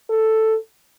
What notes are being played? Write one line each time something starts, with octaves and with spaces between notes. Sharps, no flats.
A4